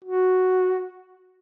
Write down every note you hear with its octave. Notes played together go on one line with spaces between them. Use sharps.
F#4